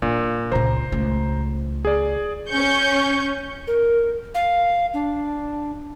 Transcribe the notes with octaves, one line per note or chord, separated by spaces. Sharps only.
A#2 D4
C#2 A#2 C5 A#5
C#2 A3
G#4 D5
C#4 C#6 G6
A#4
F5
D4